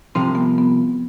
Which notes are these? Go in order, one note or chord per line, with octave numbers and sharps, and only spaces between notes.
C2 C3 F3 C4
B3
B3